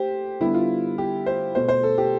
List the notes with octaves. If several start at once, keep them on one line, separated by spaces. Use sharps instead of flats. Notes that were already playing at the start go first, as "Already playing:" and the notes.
Already playing: A3 G4 C5
D3 G3 B3 E4
F4
G4
C5
B2 A3 C5
C5
A4
G4